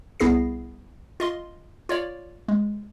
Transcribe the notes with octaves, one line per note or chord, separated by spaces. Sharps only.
C2 B3 E4 G#4 A#6 C7
F4 D#5 C6
F4 C#5 D5
G#3